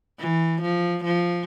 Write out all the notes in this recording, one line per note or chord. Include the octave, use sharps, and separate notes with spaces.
E3
F3
F3